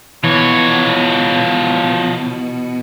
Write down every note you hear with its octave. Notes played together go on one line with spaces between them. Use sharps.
B2 E3 F3 C#5